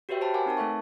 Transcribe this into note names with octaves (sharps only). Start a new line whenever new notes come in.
F#4 G4 B4 C#5 E5 G5
C5 G5 A5 B5
A#4 C#5 F#5 G#5 D6
C4 D#4 A#4 A5
A3 A4 B4 E5 C#6